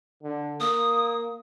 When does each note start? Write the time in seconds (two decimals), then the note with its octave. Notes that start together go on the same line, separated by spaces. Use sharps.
0.23 D3
0.60 A#3 D#6